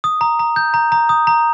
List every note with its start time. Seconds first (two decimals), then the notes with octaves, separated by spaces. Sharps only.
0.04 D#6
0.21 A#5
0.39 A#5
0.56 G6
0.74 A#5
0.92 A#5
1.09 D#6
1.27 A#5